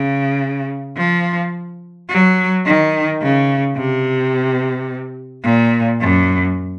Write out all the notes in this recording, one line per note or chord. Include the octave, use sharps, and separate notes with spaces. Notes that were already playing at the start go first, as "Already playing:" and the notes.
Already playing: C#3
F3
F#3
D#3
C#3
C3
A#2
F#2